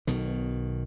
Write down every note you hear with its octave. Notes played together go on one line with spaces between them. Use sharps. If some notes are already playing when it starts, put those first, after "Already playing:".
B1 B2 D#3